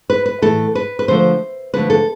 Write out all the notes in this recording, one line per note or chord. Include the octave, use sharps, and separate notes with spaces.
B4
B4
A2 E3 A3 A4
B4
B4
D3 F3 A3 C5
D3 F3 A3 B4
A4